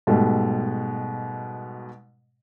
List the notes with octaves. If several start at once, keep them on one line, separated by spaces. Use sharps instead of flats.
G#2 B2 G3 A3